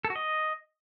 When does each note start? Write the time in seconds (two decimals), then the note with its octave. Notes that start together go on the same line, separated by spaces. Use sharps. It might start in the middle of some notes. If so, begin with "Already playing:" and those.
0.05 A4
0.10 F#4
0.16 D#5